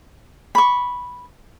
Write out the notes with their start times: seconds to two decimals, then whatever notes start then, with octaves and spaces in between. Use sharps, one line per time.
0.55 B5 C#6